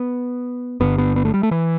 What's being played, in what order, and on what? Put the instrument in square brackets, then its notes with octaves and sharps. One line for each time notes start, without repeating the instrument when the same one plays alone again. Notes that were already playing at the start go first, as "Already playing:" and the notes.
Already playing: [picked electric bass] B3
G1 G2 D3 B3
B3
B3
A3
G3
A3
E3